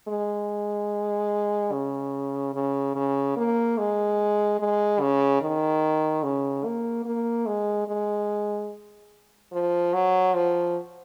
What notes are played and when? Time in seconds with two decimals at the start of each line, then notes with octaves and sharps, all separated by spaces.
0.08 G#3
1.72 C#3
2.54 C#3
2.95 C#3
3.37 A#3
3.78 G#3
4.59 G#3
5.00 C#3
5.41 D#3
6.23 C#3
6.65 A#3
7.05 A#3
7.46 G#3
7.88 G#3
9.52 F3
9.94 F#3
10.34 F3